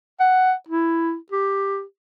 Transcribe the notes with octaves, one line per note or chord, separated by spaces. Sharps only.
F#5
E4
G4